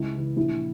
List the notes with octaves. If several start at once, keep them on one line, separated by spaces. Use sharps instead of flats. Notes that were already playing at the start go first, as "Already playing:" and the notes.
Already playing: C#2 E4
C#3 E3
A#1 E4